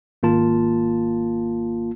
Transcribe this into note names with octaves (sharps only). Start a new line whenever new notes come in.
G#1 A#3 F4 A5